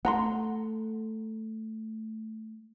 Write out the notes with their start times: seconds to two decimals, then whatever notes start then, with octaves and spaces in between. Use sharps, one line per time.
0.05 A3 F#5 A#5 C6